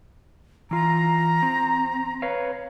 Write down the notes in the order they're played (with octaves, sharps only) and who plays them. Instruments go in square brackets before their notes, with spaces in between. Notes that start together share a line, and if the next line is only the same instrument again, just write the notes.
[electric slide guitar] E3 F4 [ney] A#5
[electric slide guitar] C4
B4 C#5 F5